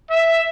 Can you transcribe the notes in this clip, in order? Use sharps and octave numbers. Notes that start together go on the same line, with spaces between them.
E5